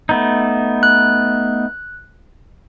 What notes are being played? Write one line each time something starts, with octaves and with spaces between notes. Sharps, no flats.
A3 B3 D#4
F#6